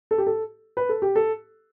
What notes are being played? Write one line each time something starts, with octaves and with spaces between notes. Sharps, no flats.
A4
G4
A4
B4
A4
G4
A4